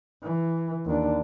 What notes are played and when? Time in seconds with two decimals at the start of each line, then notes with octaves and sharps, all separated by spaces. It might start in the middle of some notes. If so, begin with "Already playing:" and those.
0.23 E3
0.86 D#2 D4